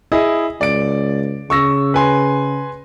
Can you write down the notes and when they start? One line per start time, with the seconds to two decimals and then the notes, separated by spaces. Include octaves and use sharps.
0.12 E4 G#4 D#5
0.61 C#2 D5 D7
1.50 C#3 C#6 E6 A#6
1.94 B4 G#5 C6